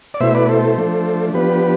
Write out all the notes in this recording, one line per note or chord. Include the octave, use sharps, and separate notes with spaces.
D5
B2 A3 E4 C5 E5
B4 D5
A4 C5
F3 A3 D4
F3 B3 D4 G4 B4